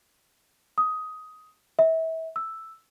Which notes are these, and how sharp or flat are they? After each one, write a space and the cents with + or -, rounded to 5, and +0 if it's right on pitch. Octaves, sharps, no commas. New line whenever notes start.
D#6 +15
E5 -30
E6 +0